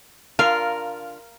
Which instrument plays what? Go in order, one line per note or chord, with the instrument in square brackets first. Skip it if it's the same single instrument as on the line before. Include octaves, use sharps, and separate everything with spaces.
[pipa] D3 F4 [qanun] A#4 [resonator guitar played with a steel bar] F5